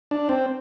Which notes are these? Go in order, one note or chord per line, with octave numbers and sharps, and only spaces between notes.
D4
C4